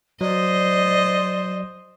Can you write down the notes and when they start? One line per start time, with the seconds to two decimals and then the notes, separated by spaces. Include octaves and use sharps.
0.21 F#3 C5 D5 D#5